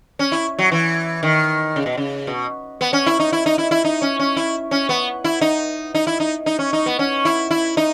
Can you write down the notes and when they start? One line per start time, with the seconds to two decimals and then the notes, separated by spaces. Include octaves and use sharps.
0.19 C#4
0.32 E4
0.59 F#3
0.72 E3
1.23 D#3
1.76 C#3
1.86 B2
1.97 C#3
2.27 B2
2.81 B3
2.93 C#4
3.06 E4
3.19 D#4
3.32 E4
3.46 D#4
3.58 E4
3.71 E4
3.84 D#4
4.02 C#4
4.19 C#4
4.36 E4
4.71 C#4
4.89 B3
5.24 E4
5.41 D#4
5.95 D#4
6.07 E4
6.20 D#4
6.46 D#4
6.59 C#4
6.73 D#4
6.86 B3
6.99 C#4
7.25 E4
7.51 E4
7.77 D#4